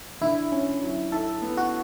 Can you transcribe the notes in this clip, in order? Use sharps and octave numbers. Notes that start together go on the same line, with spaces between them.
D3 E4
C#4
F#3
E4 A4
B3
F#4